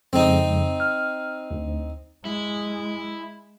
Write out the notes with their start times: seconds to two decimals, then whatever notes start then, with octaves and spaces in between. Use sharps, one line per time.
0.13 F2 C#3 G#3 C4 D#4
0.80 F6
1.51 D2
2.25 G#3 E4